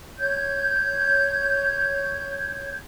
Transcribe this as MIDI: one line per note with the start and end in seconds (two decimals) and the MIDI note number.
0.18 2.76 73
0.18 2.76 91
0.18 2.76 92